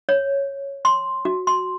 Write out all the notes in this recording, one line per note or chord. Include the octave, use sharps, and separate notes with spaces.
C#5
C6
F#4
C6